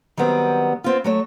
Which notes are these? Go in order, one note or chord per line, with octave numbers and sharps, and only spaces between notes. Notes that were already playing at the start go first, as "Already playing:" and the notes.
D#3 F#3 G3 B3 C4
B3 C4 F4
F#3 A3 C#5